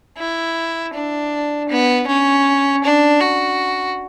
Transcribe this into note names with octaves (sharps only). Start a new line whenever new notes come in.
E4
D4
B3
C#4
D4
F#4